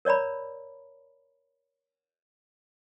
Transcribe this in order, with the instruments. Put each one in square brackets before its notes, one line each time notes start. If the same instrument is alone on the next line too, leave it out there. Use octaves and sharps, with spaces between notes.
[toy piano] A#4 C#5 D5 A#5 B5